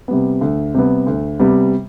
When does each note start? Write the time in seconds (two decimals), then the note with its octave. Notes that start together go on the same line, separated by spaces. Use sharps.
0.08 C3 G3 B3
0.41 D2
0.74 C3 G3 B3
1.07 D2
1.39 C3 G3 B3